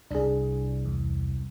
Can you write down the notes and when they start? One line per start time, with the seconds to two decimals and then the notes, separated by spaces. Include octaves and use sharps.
0.11 C2 D4 G#4
0.85 E2